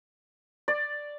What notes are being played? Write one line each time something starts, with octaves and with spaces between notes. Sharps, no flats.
D5